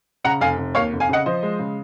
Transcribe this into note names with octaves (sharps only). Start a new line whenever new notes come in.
C#3 F#5 A#5
F1 F5 G#5
F1
D#2 C#5 F5
F1
F5 G#5
C#3 D#5 F#5
F3 C5 D#5
G#3
C#3